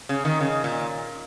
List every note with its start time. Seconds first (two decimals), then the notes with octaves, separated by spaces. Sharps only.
0.09 C#3
0.25 D#3
0.40 C#3
0.64 A#2